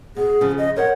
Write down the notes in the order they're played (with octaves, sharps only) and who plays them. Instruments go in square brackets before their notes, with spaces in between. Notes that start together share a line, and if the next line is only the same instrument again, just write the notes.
[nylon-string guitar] B2 [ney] G#4
[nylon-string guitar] C#3 F3
[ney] D#5
[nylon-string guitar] A#4 C5 F#5 [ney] C#5